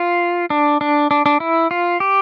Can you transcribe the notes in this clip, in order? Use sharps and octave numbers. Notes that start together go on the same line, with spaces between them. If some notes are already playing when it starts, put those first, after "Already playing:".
Already playing: F4
D4
D4
D4
D4
E4
F4
G4